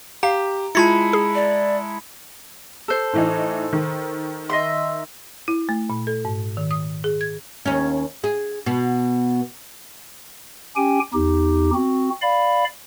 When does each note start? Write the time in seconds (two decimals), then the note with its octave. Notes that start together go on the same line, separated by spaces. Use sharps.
0.23 G4 F5 A#5
0.75 G#3 E4 F4 A5 B5 G#6 C#7
1.13 G#4
1.35 D5
2.88 A4 C5
3.13 A2 E3 D#4
3.72 D#3
4.50 D#5 E5 C6
5.48 E4
5.69 A3
5.90 A#2
6.07 A4
6.25 G#2
6.57 D#3
6.71 D#6
7.04 G#4
7.21 G#6
7.66 D#2 C#4
8.24 G#4
8.66 B2 B3
10.76 C#4 G4 G5 G#5
11.13 E2 D#4 G4
11.74 C4 F#4
12.22 D5 F5 B5